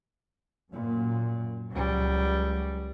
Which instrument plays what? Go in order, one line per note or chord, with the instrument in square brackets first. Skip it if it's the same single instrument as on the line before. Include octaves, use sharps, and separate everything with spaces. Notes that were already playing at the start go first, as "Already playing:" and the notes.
[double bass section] F#2 A#2
[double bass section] C#2 [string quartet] F#3 G3